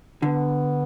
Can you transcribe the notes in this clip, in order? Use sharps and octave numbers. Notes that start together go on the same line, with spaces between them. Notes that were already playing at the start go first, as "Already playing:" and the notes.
D3 B3